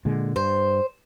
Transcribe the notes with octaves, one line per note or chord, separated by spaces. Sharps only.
A#2 D3 G#3
G2 C5